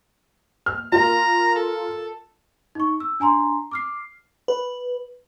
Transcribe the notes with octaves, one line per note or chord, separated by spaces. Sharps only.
F6
F4 A#4 A#5
A4
D#4 C#6
E6
D4 G#5 A#5 C6
D6 F6 C7
B4